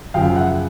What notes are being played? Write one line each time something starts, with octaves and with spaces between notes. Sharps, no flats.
F#2 C#3 F3 F5 G5
E5 F#5